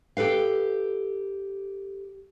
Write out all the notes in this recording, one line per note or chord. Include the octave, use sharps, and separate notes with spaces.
G4 A4 B4 F5